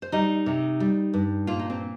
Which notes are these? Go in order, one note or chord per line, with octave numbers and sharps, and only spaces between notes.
C5
G3 D#4 D#5
C3
G3
G2
A#2 F4
D#4
C4